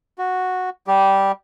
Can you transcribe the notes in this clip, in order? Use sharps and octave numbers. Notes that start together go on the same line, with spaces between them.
F#4
G3 G4